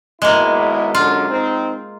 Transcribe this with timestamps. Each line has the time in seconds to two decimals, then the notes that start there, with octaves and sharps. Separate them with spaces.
0.22 G#1 B2 G#3 A#3 E4
0.95 F#2 D3 F4
1.30 C4 D#4